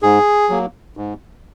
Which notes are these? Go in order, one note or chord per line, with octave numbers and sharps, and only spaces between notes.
G#2 G#4
F#3 A#3
G#2